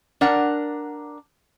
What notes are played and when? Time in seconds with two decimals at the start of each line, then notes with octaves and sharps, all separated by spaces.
0.21 D4 A#4 F#5